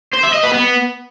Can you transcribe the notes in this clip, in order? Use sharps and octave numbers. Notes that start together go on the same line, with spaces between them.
C5
E5
D#5
B4
B3